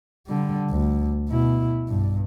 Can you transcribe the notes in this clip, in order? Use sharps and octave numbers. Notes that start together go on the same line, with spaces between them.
D3 G3
D2
B2 E4
B1 G2